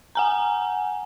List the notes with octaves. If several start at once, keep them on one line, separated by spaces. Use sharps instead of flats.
F#5 G#5 A#5